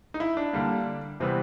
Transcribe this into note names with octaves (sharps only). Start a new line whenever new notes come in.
D#4
E4
D4
D3 G3 A#3
C3 E3 G3 B3 C4